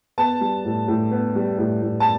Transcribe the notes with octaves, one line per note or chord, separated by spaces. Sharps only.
B3 A5
G3
A2
A2
B3
G3
A2
A2
A5